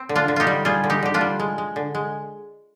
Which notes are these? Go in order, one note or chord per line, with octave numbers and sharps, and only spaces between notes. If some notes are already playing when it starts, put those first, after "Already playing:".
Already playing: C4
D3
D4 F4
D3
D#4 F4 G4
G3
G3 F4 G#4
D3
D#4 G4
D3 G4
D4 F4
G3
G#3
G#3
D3
G#3